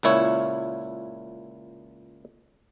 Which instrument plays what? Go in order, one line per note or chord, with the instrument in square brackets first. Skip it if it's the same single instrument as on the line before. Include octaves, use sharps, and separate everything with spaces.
[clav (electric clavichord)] C#2 A#2 E4 C#5